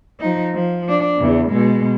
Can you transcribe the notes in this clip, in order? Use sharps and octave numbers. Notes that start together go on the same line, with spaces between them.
F3 D#4
F3
D4
E2 C#3
B2 G#3